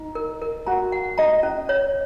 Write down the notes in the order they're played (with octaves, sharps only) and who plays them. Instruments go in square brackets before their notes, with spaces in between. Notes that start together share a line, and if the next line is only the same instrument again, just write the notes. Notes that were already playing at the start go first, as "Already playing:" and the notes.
Already playing: [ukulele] D#4
[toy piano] A#4
A#4
[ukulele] F#4 [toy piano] A#5
[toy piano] F#5
[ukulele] D#5 [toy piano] A#5
[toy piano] C#4
C#5